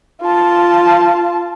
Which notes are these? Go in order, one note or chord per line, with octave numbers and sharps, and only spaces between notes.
F4 A5